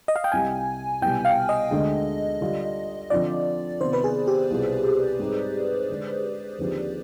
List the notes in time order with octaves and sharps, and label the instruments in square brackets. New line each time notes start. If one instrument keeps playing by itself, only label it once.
[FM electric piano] D#5
F5
G5
[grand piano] C2 C3 G3 [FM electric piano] G#5
[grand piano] C2 B2 G3 B3 [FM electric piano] G5
[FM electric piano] F5
D#5
[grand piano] D2 D3 G#3
D3 G3 D4 F4
[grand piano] D3 F3 C4 F4 [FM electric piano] D5
[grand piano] C3 D#3 B3 F4 [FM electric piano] C5
[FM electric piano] B4
G#4
G4
[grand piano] C2 B2 G3 C4 F4
G#2 G3 C4 D#4
D3 G#3 D4
D#2 D3 F3 C4 D#4